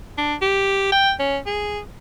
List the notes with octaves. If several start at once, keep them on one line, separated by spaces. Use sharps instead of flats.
D4
G4
G5
C#4
G#4